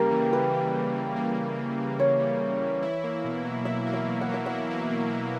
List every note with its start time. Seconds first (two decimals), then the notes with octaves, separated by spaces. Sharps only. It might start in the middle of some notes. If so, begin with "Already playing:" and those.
Already playing: C#3 G3 A#3 G4 A#4
0.11 E3
0.33 A#3 B4
0.54 G3
0.74 C#3
0.96 E3
1.16 A#3
1.37 G3
1.58 C#3
1.78 E3
1.99 A#3 C#5
2.20 G3
2.41 C#3
2.62 E3
2.82 E4
3.04 A#3
3.25 B2
3.45 F#3
3.65 E4 E5
3.87 A#3
3.94 E5
4.07 B2
4.21 F#5
4.29 F#3
4.34 E5
4.46 E4 F#5
4.71 A#3
4.90 B2
5.11 F#3